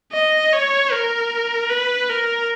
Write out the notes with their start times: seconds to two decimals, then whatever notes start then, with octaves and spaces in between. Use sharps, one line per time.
0.13 D#5
0.53 C#5
0.92 A#4
1.70 B4
2.10 A#4